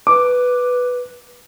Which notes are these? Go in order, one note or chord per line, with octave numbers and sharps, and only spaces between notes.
B4 D6